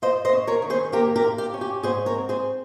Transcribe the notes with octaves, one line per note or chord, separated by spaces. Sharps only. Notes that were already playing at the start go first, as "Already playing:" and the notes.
F4 C5 D#5
C5 D#5
C#4
A#4 C#5
D#3
G#4 C5
A#3 G4 A#4
G4 A#4
F4
G4
C#4
G4
G#2 G#4 C5
A#4 C#5
C4
G#4 C5